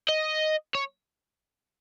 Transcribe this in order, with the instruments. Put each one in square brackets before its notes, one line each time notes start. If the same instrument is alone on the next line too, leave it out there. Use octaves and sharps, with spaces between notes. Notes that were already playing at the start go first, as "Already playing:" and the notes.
[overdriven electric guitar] D#5
C#5